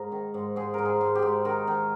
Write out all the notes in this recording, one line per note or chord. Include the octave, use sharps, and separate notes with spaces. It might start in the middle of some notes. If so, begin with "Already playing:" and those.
Already playing: G#2 A#4
D#3
G#2
G#2 G#4
G#2 A#4
G#4
G#2
G4
G#2
D#3 A#4
D#3